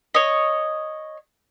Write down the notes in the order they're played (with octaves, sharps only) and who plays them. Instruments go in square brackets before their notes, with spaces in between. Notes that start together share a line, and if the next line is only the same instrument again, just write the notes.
[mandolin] C#5 D#5